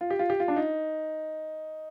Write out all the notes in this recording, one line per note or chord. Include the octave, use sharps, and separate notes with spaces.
F4
G4
F4
G4
F4
D4
D#4